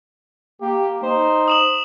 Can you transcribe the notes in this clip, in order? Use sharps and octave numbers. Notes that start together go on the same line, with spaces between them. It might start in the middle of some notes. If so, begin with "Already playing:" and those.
A#3 G4
D#4 C5
D#6 E7 F#7